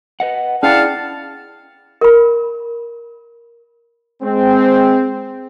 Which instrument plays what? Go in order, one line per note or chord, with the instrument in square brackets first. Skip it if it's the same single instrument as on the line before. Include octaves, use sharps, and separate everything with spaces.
[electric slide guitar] B4 D#5 F#5
[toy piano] C#4 [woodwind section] D4 F#5 A5 [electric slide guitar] E4 G#4 [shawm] F5
[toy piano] A#4 B5
[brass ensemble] G#3 C4